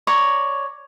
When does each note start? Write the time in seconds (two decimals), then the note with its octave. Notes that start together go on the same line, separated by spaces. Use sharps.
0.07 C#5 D5 A#5